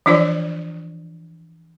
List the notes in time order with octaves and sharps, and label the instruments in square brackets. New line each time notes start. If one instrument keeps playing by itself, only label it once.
[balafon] E3 F3 D4 F4 C5 D5